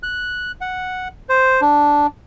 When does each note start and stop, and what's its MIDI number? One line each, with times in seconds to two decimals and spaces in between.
0.03 0.52 90
0.61 1.08 78
1.29 1.61 72
1.61 2.07 62